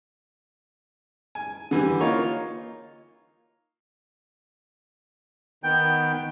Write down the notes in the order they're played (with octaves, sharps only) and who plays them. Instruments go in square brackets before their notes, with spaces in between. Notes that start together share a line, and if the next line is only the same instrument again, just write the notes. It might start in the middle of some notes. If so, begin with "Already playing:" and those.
[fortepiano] G#5
D3 E3 G3
A#3 D#4 F4 C#5
[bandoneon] D#3 B3 G5 G6